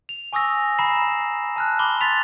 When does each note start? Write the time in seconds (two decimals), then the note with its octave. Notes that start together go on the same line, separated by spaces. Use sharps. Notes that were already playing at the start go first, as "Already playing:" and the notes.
0.09 F7
0.33 G#5 C#6 D#6 E6 A#6
0.79 A#5 B5 C7 E7
1.56 A5 F6 F#6
1.79 B5 C6 D6 G7
2.01 C6 A6 B6 F7